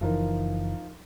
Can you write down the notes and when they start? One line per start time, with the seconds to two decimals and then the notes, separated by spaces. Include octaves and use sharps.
0.01 F#1 E3 F3 D#4 A#4